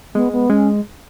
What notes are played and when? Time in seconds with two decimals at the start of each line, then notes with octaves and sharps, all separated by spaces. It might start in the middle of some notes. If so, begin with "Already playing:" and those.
0.15 G#3 B3
0.32 B3
0.50 G#3 C#4